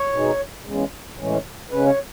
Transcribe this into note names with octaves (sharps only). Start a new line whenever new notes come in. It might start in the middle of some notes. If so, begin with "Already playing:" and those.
Already playing: C#5
B2 G#3 D#4
E2 C#3 G#3
A2 E3 G#3 C#4
C#3 G#3 C#4 B4
C#5